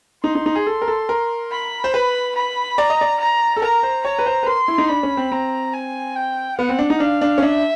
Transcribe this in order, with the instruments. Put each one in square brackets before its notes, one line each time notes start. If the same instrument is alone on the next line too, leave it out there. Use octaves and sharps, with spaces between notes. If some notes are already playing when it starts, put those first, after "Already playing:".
[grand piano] D#4 [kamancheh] C6
[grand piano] D#4
D#4
G#4
A4
A#4
A4
A#4
[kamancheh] B5
[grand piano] C5
[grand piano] B4 [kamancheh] B5
[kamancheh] B5
[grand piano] D5 [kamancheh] A#5
[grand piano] D#5
D5
[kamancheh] A#5
[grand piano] A4
[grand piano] A#4 [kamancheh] A#5
[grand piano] C5
[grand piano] C#5 [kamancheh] A#5
[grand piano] B4
C5
B4
[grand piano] A#4 [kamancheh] C6
[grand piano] E4
D#4
[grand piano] D4 [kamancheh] B5
[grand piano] C#4
C4
[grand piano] C4 [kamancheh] A#5
[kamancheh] G#5
G5
[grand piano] B3 [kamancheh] F#5
[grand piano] C4
D4
D#4
[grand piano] D4 [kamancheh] F5
[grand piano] D4
C#4
[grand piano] D4 [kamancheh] E5